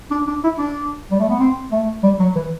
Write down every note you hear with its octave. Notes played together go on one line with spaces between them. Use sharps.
D4
D4
E4
D4
G3
A3
B3
C4
A3
G3
F#3
E3